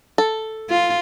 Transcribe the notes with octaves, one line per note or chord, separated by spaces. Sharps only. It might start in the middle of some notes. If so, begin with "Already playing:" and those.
A4
F4